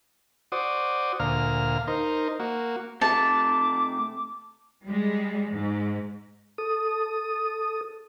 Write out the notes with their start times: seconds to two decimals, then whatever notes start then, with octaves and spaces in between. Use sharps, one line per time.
0.52 F#4 C5 D5 D#6
1.20 D2 A#2 F5 A#5 F6
1.87 D#4 A#4 C5
2.40 A#3 F#4
3.01 C3 A3 A5 D6
4.85 G3 G#3
5.50 G#2
6.58 A4 D#6